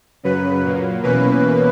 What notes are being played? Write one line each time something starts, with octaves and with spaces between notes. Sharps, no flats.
F#2 C#3 F#3 B4
A#2 F#3 A#3
E2 B2 A#3 C#4 B4